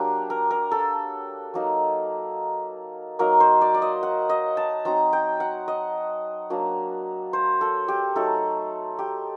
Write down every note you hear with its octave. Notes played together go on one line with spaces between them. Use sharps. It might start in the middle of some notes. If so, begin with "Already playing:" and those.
Already playing: F#3 A#3 D4 G4
A#4
A#4
A4
F#3 A#3 D#4
F#3 A#3 D#4 A#4
C5
D5
D5
D#5
F#5
D#5
A5
F#3 C4 D#4 A#5
G5
F#5
D#5
F#3 A#3 D4
C5
A4
G4
F#3 A3 D#4 A4
G4